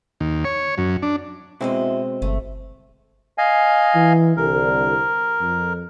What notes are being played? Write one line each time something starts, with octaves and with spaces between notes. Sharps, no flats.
D#2
C#5
F#2
D4
B2 G#3 C4 E4 F#4 D#5
G1 A3
D#5 F5 G#5
E3
C2 D3 A#4
F2